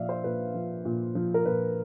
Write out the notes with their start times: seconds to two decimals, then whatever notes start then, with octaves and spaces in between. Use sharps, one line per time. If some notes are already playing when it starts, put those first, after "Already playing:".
Already playing: A#2 F3 D5 E5 F5
0.09 C5
0.24 A#2 B4
0.54 F3
0.85 A#2
1.15 F3
1.34 A#4
1.46 A#2 B4